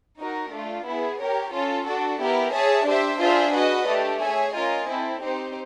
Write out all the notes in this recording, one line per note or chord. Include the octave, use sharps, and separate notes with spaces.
D#4 F#4 A#4
A3 D4 F4
B3 E4 G#4
G4 A#4 C#5
C#4 F4 A4
D4 F#4 A4
B3 E4 G4 A#4
G#4 C#5 E5 A5
D4 G4 C5 E5
D4 F4 G#4 C5 E5
F#4 B4 D#5
A3 D4 G4
G#4 C#5 E5 G#5
C#4 F4 A#4 D#5 G#5
C4 E4 A4
C4 D#4 G4 C5